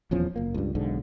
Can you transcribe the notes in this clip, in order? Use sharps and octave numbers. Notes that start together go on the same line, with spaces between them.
D#1 E2 F3 C#4
F#1 A#3
C#2 G2
B1 G#2 D3